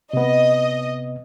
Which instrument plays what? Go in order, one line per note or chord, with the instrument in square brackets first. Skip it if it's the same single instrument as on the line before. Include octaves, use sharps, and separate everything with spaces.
[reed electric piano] C3 B3 [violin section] D#5